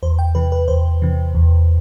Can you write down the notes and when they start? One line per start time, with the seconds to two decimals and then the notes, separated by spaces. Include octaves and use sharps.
0.03 E2 C5
0.19 G5
0.35 C3 E3 B4
0.52 B4
0.68 E2 C5
1.02 C3 E3
1.35 E2